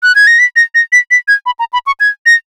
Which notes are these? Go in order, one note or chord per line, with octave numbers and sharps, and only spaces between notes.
F#6
G#6
A#6
B6
A#6
A#6
B6
B6
G#6
B5
A#5
B5
C#6
G#6
A#6